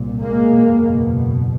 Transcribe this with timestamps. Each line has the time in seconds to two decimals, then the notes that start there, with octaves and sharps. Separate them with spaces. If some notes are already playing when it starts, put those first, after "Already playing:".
Already playing: C2 A#2
0.21 G#3 A#3
0.53 F#1 E2 B2